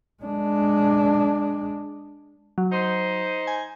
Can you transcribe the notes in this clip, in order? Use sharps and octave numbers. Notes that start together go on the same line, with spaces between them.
G#3 D4
F#3
D#4 C5
G#5